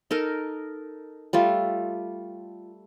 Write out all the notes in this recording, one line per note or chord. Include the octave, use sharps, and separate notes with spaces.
D#4 A4 A#4
G3 A3 F4